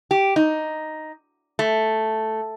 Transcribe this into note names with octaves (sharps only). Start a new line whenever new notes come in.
G4
D#4
A3